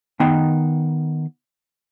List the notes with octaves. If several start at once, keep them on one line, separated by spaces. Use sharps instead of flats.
D#3 B3 D#4 G5 C6